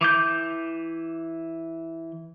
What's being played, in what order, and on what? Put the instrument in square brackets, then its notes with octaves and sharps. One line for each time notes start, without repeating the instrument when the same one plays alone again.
[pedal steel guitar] E3 D6 G6